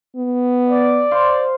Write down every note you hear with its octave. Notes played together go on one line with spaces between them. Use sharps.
B3
D5
C5 F5 C6